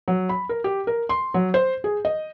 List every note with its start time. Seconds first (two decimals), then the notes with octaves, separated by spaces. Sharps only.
0.08 F#3
0.29 B5
0.49 A#4
0.64 G4
0.87 A#4
1.09 C6
1.34 F#3
1.54 C5
1.84 G#4
2.05 D#5